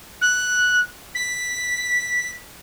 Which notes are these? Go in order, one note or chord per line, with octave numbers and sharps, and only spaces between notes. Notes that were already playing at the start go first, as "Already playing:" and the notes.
F#6
B6